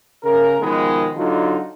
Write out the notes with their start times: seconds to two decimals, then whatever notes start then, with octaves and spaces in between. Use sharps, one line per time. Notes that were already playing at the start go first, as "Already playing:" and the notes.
0.24 C#3 A#4
0.61 B2 D#3 F3 G#3 B3
1.16 D3 F#3 D#4 F4